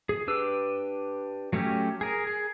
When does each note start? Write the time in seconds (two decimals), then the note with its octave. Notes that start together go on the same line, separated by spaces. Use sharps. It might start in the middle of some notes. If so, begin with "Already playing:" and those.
0.09 G#4
0.28 D4 G4 B4 E6
1.53 F#3 A3 C#4 G4
2.01 G#4 A#4
2.27 G#4